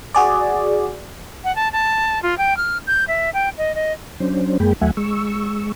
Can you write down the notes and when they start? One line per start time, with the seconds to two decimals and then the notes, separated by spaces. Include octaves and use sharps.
0.14 F#4 G#4 D5
1.44 F#5
1.55 A5
1.72 A5
2.22 F4
2.37 G5
2.56 F6
2.86 G6
3.07 E5
3.33 G5
3.57 D#5
3.75 D#5
4.20 F#3 C#4 D4 C5
4.60 F#2 G#3 A#3 G#4 G5 B5
4.81 D#2 F#3 A3 E5 F#5 G#5
4.97 G#3 C#6 E6